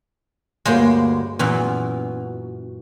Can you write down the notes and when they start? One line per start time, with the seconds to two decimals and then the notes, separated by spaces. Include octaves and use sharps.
0.65 D2 G2 G#3 A#3 C5 C#5
1.39 F#2 A#2 E3 B3